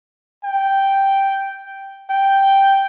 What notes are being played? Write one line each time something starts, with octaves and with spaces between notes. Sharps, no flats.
G5
G5